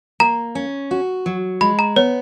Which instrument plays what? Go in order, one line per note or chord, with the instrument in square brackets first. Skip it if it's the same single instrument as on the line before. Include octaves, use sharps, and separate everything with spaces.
[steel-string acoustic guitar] A#3 [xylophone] A#5
[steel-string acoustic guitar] C#4
F#4
F#3
[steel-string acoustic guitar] G#3 [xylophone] B5
[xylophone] A#5
[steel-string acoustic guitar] B3 [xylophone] C#5